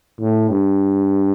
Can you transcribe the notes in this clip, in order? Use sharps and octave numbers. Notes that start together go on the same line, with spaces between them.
A2
G2